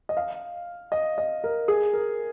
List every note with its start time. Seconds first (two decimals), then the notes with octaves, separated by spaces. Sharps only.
0.09 D#5
0.17 F5
0.92 D#5
1.18 D#5
1.44 A#4
1.68 G#4
1.93 A#4